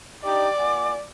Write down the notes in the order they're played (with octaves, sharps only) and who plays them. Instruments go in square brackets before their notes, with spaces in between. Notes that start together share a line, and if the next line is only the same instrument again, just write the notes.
[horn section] D4 D#4 G4 [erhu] D5 [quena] D6
[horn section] A#2 F#5 G#5